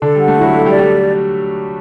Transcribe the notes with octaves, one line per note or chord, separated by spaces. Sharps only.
D3 D4 A4
G3 F#5
A3
F#3 E4 F#4
G3 G4 A4
G3 G4
D5
G3 G4